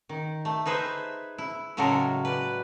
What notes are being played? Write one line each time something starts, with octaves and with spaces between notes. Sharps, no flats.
D#3
A3
D#4 G#4 B4 C5 E5
E4
A2 C#3 F#3 G#3 A4 A#4
B4 D5